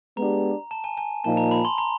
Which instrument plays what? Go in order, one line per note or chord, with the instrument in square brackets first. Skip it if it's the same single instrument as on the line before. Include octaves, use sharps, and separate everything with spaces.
[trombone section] G#3 B3 D4 G4 [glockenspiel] A#5
[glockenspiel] A5
G#5
G#5
[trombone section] A#2 F3 A#3 D#4 [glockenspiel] A5
[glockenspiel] A#5
B5
C6
A#5